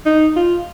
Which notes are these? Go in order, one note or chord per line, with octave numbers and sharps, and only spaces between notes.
D#4
F4